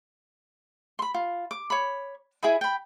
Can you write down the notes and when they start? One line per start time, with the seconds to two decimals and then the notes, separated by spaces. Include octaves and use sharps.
0.99 B5 C6
1.14 F4
1.51 D6
1.70 C#5 B5
2.43 E4 G#4 D#5 B5
2.61 G5 B5